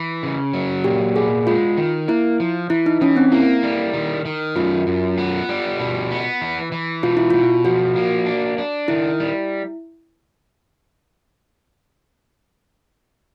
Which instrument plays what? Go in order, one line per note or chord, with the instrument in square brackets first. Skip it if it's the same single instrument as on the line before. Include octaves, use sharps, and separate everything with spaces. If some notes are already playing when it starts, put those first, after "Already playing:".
Already playing: [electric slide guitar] E3
C#3
F#3
[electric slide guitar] A#2 [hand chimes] G4
[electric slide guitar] B3 [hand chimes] G#4
[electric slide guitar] G#3 [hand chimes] F4
[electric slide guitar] D#3
[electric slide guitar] A#3 [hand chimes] E4
[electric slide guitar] F3
[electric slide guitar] E3 [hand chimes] E4
[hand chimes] D#4
[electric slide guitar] E3 [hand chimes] C#4
[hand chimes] C4
[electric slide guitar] A#3 [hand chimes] E4
[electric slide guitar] G3
D#3
D#3
[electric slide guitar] F#2 [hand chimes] F4
[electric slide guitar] F#2
B3
G3
B2
B3
E3
E3
[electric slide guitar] B2 [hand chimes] F4
[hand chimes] E4
[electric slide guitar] B2 [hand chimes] F4
[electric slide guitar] F3 [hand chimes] F#4
[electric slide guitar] A#3
D4
D4
[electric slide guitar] D#3 [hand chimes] E4
[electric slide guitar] G3